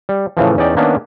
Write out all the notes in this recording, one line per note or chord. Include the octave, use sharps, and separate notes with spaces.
G3
A2 C#3 E3 F3
E2 C#4 D#4 D5 G5
D#3 A#3 B3 C#4 D4